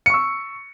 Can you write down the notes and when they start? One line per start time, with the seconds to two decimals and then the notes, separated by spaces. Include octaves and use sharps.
0.06 C#7
0.10 C#6
0.14 E6